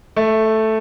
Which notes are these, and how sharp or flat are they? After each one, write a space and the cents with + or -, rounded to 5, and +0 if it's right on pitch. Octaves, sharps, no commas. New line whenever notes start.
A3 +0